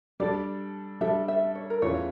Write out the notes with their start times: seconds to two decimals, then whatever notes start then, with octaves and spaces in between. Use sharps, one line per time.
0.20 G3 D4 A4 D5
1.01 G3 D4 A4 E5
1.28 E5
1.55 C#5
1.70 A#4
1.82 E2 E3 A3 C#4 F4 C#5